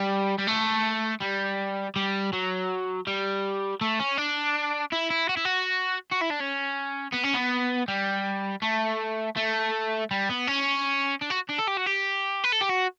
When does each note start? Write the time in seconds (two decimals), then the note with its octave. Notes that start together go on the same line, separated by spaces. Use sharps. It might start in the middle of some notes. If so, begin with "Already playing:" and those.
Already playing: G3
0.38 G3
0.47 A3
1.22 G3
1.96 G3
2.33 F#3
3.07 G3
3.81 A3
3.99 C#4
4.17 D4
4.92 E4
5.10 E4
5.29 F#4
5.37 E4
5.45 F#4
6.12 F#4
6.22 E4
6.31 D4
6.40 C#4
7.14 B3
7.24 C#4
7.34 B3
7.88 G3
8.62 A3
9.36 A3
10.11 G3
10.29 B3
10.48 C#4
11.22 D4
11.31 F#4
11.50 D4
11.59 A4
11.68 G4
11.77 F#4
11.86 G4
12.44 B4
12.52 A4
12.61 G4
12.70 F#4